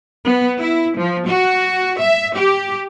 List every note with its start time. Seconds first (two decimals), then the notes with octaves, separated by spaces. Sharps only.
0.25 B3
0.57 E4
0.97 F3
1.26 F#4
1.98 E5
2.35 G4